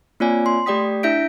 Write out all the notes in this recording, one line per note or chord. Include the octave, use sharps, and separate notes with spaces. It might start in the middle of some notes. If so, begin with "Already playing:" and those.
A#3 C4 F4 C#5 D5 G#5
C6
A3 G4 D5 G5 D#6 B6
D4 E4 E5 G6 B6 D7